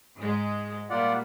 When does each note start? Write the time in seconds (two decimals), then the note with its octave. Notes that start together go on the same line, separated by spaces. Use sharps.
0.18 G#2 G#3
0.90 A#2 G3 A#3 F4 D5 F#5